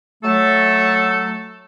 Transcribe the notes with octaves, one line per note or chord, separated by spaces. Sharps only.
F#3 A3 A4